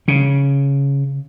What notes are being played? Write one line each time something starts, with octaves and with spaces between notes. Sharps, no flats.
C#3